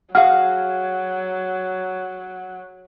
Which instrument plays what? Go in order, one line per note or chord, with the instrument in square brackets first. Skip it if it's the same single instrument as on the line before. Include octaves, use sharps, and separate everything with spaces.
[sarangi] F#3 [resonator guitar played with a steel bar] F#4 G#4 F5 [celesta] F#5 F6